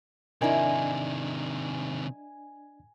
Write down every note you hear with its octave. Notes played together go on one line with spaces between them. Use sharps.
C3 D#3 D4 E4 A#4 D5 D#5 G#5